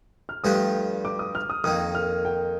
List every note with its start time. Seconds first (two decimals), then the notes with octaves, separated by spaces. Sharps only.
0.29 F6
0.44 G2 F3 A3 D4 G4 D#6
1.05 D6
1.19 D#6
1.35 F6
1.50 D#6
1.64 F2 D#3 A#3 D#6
1.95 F6
2.25 G5